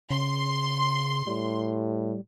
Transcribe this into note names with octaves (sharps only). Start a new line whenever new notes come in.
C#3 C6
A2 G3